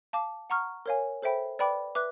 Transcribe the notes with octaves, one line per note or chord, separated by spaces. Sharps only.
F5 A5 D6
F#5 A#5 C#6 F6
A#4 C#5 F5 G#5
A4 C5 E5 G5 B5
B4 D5 G5 B5 D6
B4 E5 D6 F#6